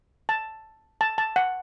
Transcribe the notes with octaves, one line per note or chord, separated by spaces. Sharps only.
A5
A5
A5
F#5